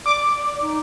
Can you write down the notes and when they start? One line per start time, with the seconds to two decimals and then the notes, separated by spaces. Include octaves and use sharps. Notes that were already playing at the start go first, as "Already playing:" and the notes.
0.06 D5 D6
0.61 D#4